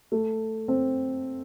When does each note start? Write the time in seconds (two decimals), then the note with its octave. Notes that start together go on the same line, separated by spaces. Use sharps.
0.12 A3
0.68 C4